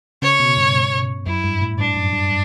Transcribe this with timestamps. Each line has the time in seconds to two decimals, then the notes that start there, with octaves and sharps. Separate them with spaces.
0.22 C#3 C#5
0.40 B2
0.57 G2
1.26 F#2 E4
1.44 G2
1.61 A2
1.78 G2 D4
1.96 F#2
2.13 G2